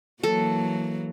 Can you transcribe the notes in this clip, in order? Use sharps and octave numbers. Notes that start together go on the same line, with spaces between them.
E3 F#3 A#3 A4